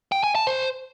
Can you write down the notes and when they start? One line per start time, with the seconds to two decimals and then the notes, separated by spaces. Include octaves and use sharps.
0.12 G5
0.24 G#5
0.35 A5
0.47 C5